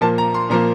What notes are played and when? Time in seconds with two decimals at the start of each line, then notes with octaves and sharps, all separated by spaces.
0.01 A#2 F3 A#3 A5
0.18 A#5
0.34 C6
0.50 A#2 F3 A#3 A#5